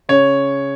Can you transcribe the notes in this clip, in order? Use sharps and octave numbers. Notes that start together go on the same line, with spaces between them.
C#3 C#5